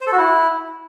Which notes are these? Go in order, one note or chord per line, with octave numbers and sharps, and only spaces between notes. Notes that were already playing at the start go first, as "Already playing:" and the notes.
C5
A4
F#4
E4